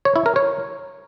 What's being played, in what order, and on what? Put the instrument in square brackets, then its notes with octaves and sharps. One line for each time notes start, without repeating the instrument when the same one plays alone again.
[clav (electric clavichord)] C#5
E4
A#4
C#5